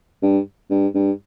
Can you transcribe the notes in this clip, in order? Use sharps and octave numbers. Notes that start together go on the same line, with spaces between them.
G2
G2
G2